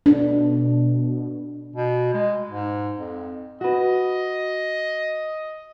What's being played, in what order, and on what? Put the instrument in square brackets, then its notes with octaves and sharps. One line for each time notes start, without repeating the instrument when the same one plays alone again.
[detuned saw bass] B2 [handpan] D4
[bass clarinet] B2
G#3
G#2
F2
[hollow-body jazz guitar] F#4 B4 [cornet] D#5